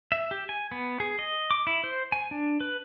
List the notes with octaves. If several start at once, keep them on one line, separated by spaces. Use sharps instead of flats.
E5
G4
G#5
B3
G#4
D#5
D6
E4
C5
G#5
D4
B4